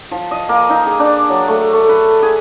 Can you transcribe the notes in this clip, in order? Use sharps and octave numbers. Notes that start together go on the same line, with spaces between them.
F3
D#5
A#3
D#4
G#4
D4
F#3
A3
A3
B4
G#4